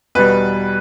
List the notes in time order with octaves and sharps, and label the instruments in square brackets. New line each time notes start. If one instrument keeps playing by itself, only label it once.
[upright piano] E2 B2 G3 B4